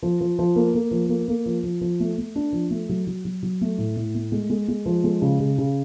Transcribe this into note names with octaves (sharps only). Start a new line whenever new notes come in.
F3
F3
F3
A#3
A#3
F3
A#3
A#3
F3
F3
F3
A3
A3
D4
F3
A3
F#3
F#3
F#3
F#3
A3
A2
A2
A3
G#3
G#3
G#3
F3
G#3
C#3
C#3
C#3